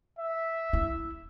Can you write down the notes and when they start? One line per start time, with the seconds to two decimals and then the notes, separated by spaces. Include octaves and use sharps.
0.19 E5
0.73 E4